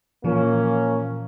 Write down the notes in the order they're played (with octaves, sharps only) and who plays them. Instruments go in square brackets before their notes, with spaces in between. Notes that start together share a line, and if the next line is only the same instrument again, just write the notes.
[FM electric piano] A#2 E3 F3 [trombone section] A#3 C#4